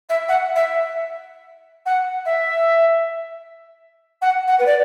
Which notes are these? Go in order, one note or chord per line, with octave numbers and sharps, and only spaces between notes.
E5
F#5
E5
F#5
E5
F#5
F#5
B4
D5